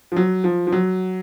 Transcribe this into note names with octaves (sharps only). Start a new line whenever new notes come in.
F3
F#3
F3
F3
F#3